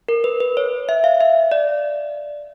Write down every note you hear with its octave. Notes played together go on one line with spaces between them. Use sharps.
A#4
B4
B4
C#5
E5
F5
E5
D5